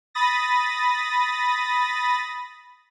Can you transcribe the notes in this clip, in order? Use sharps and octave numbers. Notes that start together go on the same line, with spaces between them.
B5 D#6 A6 A#6